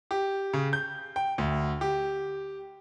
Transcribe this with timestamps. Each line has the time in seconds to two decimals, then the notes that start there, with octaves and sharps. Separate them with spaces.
0.11 G4
0.53 C#3
0.73 G6
1.16 G5
1.38 D2
1.81 G4